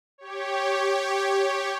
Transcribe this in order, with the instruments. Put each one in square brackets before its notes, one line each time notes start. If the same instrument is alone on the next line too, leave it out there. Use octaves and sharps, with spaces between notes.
[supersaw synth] G4 C#5